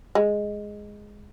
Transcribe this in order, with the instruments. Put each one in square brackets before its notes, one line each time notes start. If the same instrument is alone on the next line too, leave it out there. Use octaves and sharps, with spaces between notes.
[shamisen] G#3